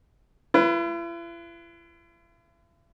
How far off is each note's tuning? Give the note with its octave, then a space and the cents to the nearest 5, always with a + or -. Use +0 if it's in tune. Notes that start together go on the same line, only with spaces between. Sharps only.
E4 +45 B4 +0